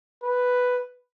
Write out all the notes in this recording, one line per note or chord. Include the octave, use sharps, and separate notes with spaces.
B4